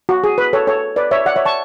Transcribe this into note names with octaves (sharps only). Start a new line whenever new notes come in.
F#4
G#4
B4
A4 C#5
A4 C#5
B4 D5
C#5 E5
D5 F#5
C#5 E5
A5 C#6